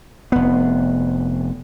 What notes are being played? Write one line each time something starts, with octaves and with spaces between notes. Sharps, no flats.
F1 B3